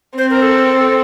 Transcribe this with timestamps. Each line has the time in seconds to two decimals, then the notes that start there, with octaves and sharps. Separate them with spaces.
0.18 C4 C5
0.30 A#4
0.42 A4